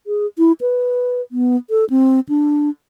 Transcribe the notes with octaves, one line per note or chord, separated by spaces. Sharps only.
G#4
E4
B4
B3
A4
C4
D4